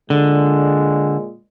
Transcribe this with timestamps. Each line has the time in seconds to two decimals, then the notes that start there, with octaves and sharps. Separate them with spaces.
0.10 A#2 D3 G#3